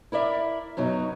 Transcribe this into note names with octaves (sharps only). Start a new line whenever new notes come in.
E4 A#4 D5 E5
F#2 B2 F#3 D#4